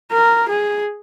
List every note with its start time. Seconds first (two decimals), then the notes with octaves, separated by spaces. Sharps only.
0.12 A#4
0.49 G#4